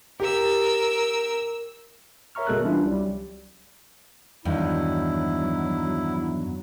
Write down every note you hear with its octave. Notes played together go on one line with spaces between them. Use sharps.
G4 A#4 E6
A#4 C#5 E5 A#5 C#6 F6
G1 B2 G#3 A4 A#4 F#6
E3 G3 C#4 D4 E4 F4
C2 F#3 G3
E2 G2 D#3 F#3 E4